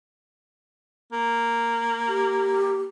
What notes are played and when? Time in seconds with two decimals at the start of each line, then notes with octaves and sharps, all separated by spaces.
1.12 A#3
2.08 G4